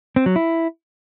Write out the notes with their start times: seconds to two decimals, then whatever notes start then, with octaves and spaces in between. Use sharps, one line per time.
0.16 C4
0.26 F#3
0.36 E4